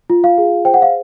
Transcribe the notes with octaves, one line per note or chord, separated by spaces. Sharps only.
F4
F5
G#4
C5 G5
F#5
F5